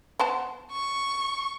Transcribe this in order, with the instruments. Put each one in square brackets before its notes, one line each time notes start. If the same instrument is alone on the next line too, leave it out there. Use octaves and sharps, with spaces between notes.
[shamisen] B3 C5 A5
[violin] C#6